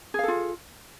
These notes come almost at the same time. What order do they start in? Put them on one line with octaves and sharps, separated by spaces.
G#4 F5 A4 F4